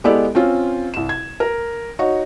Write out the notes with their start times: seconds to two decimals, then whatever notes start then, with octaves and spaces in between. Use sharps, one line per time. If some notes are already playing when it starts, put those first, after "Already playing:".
0.04 G#3 B3 E4 G4 A4 D5
0.35 C4 C#4 F4
0.94 C2 E7
1.09 G#6
1.40 A#4
1.99 D#4 F#4 C#5